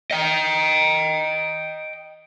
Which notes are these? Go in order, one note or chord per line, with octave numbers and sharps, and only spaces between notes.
D#5 G5